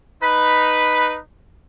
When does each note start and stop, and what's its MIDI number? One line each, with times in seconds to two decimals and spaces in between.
0.22 1.20 63
0.22 1.20 71
0.22 1.09 83